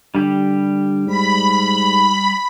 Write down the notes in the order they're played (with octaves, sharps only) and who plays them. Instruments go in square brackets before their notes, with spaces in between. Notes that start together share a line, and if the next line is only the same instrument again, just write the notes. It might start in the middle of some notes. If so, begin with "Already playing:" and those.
[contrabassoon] D3 [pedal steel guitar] G3 G4
[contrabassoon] G#2 [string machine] B5